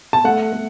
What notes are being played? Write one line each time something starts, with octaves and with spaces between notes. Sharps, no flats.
A5
A3 F#5
A3